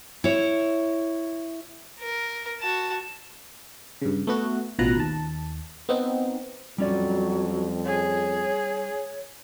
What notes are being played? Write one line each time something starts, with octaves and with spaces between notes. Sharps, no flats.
E4 C#5
A#4
F#4 A5
G2 C#3
A3 B3 F#4
A1 B2 F3 B4 A#5 F#6
D#2 A5
B3 C4 D#4
F2 F#3 G3 C#4 D5
G#4 C#5